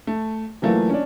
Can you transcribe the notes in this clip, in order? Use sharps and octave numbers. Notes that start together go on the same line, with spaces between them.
A3
E3 F#3 A3 A#3 F4
C#4 D4